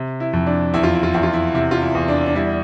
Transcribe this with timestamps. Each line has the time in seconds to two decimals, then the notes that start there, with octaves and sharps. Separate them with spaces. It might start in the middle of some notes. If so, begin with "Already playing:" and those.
Already playing: C3
0.20 E4
0.33 F2
0.47 D4
0.74 E2 E4
0.83 F4
0.93 E4
1.03 F4
1.14 E2 E4
1.23 F4
1.33 E4
1.54 C3 E4
1.71 F4
1.82 E4
1.95 E2
2.08 D4
2.26 D4
2.35 G3 E4